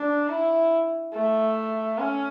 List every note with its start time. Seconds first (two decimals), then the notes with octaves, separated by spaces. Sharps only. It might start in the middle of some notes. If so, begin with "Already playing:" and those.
Already playing: D4
0.29 E4
1.14 A3
1.99 C#4